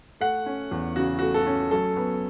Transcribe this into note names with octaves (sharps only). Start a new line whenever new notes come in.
A3 F#5
C#4
E2
C#3 F#4
F#4
A3
A4
C#4
F#3 A4
B3